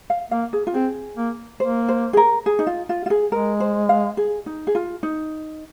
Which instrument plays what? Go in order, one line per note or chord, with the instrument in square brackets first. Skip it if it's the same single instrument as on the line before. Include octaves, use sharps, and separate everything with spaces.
[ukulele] F5
[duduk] A#3 [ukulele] F5
[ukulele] G#4
F4
[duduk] C4 [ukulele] G#4
[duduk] A#3
[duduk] A#3 [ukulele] C5
[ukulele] C5
G#4
A#4
G#4
D#4
F4
F4
F4
G#4
[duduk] G#3 [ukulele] A#4
[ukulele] C5
F5
G#4
D#4
G#4
F4
D#4